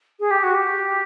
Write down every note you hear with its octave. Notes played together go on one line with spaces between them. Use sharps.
G#4
G4
F#4
G4